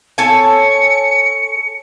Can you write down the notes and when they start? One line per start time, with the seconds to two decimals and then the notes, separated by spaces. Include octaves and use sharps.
0.18 A4 C#5 G#5 C#7